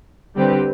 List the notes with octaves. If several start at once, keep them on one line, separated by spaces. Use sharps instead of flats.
D3 G3 C4 G4 B4